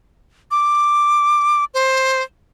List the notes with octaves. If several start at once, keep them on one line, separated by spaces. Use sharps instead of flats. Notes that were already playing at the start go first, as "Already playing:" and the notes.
D6
C5